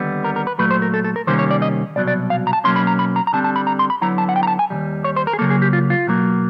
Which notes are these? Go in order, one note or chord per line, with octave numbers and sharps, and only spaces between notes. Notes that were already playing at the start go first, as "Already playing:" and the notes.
Already playing: D#2 D3 G3 B3
A#4
A#4
B4
A#2 F#3 A3 B4
C5
A#4
A4
A4
A#4
C3 D#3 G3 A#3 C#4 C5
C#5
D5
D#5
C2 B2 F#3 D5
D5
F5
A#5
A5
B2 F#3 A#3 C#4 C6
B5
A#5
B5
A#5
A#5
D3 G3 C4 A5
A5
B5
A#5
C6
B5
D3 F#3 B3 E4 A#5
A5
F#5
G5
A#5
A5
G#5
D#2 D#3 G3
C#5
C5
A#4
G#4
C#3 F#3 A#3 A4
G#4
G4
F4
F4
B2 F#3 A#3